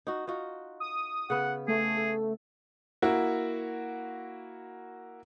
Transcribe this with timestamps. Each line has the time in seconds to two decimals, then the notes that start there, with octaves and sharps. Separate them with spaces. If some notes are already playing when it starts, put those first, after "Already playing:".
0.07 D#4 F#4
0.27 D#4 F4 F#4
0.80 D#6
1.30 C#3 B3 F#5
1.68 A3 G#4
1.97 A4
3.02 A#3 E4 F#4